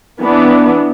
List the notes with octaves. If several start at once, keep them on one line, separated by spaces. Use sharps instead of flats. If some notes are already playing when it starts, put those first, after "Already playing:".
E3 B3 D4